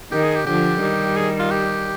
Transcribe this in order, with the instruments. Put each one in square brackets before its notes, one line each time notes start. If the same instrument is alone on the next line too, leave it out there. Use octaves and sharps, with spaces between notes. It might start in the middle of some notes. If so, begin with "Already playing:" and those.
[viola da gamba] D#3 [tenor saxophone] G4
[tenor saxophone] G#4
G4
[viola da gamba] D3 F3 [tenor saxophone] G4
[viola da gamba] D#3 G3
[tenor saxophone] G#4
F4
G4